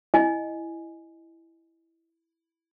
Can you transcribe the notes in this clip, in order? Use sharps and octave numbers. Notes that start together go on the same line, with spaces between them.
E4 D#5 G#5